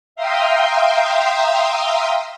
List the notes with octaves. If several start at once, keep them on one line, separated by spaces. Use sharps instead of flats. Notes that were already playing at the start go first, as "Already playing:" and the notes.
E5 F5 G5 A#5 C6 D#6